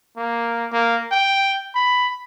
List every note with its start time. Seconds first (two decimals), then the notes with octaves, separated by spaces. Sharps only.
0.17 A#3
0.72 A#3
1.12 G5
1.75 B5